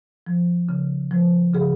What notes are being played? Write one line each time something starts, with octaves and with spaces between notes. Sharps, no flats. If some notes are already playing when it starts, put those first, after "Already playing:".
F3
C#3
F3
C#3 G#4